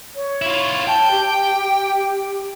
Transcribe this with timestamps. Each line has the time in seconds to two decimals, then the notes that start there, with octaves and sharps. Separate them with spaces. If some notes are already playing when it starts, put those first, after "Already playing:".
0.16 C#5
0.42 E4 F4
0.87 G5 A5
1.11 G4